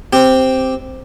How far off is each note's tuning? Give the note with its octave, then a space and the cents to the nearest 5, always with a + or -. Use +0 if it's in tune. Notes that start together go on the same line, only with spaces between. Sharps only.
C4 +0 G4 +0